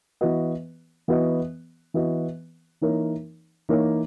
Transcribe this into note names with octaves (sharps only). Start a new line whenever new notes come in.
E3 B3 F#4 B4 D#5
E3 B3 F#4 B4 D#5
E3 B3 F#4 B4 D#5
E3 A#3 D#4 A#4 C#5
E3 A#3 D#4 A#4 C#5